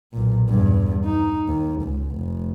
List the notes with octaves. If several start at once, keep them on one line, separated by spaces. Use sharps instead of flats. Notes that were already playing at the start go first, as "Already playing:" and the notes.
B1 A#2
E2 G2
D#4
D#2
C#2
F1